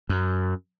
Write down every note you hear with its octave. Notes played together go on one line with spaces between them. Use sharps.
F#2